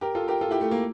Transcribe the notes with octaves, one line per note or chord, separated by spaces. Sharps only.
G4 A#4
F4 A4
G4 A#4
F4 A4
E4 G4
A3
A#3